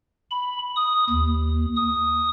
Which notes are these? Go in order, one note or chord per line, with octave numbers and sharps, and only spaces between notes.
B5
D#6
D#2
D#6